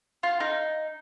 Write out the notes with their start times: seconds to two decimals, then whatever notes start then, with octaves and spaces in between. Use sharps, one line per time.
0.23 F4
0.40 D#4